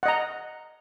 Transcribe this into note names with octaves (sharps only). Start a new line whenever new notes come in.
D#5 F#5 A#5